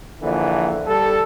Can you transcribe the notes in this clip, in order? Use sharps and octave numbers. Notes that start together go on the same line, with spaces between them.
A#1 D3 E3
G3 A4